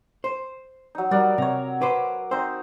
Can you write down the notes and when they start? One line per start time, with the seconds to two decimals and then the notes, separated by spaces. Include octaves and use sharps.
0.24 C5
0.95 F#3 D#4
1.11 G3 F#4 A#4 D5
1.38 C3 C#5 A#5
1.82 B4 C5 D6
2.31 C4 D#4 C5